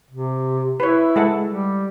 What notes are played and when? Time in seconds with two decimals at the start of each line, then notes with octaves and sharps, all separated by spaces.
0.11 C3
0.80 E4 B4 C#5
1.16 G#3 A4 F#5
1.47 G3